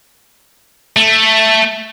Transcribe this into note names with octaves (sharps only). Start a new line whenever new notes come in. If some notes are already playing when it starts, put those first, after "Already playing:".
A3